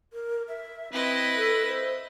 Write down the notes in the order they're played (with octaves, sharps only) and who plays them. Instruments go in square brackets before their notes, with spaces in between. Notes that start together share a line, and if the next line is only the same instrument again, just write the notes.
[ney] A#4
E5
[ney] C4 [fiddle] E4 D#5 [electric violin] B4
[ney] A4
C5